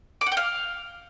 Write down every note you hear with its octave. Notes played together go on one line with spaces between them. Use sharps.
D6
F#5
G5
F5